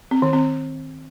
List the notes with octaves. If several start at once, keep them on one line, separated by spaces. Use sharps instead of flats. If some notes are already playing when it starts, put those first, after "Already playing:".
C4
D#3
C4